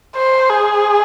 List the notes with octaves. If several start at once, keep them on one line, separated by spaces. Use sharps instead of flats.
C5
G#4